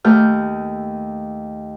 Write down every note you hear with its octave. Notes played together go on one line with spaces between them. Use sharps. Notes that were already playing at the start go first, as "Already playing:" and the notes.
D#2 A3 F6 G6